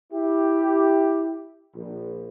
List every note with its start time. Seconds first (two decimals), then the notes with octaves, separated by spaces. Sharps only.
0.12 E4 G4
1.75 A#1